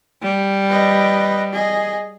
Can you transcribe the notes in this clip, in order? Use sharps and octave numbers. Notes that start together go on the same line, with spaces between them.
G3
B4 D#5
G#4 D#5